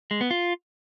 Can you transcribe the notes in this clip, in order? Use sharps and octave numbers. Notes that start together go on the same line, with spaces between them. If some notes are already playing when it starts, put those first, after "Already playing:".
G#3
B3
F4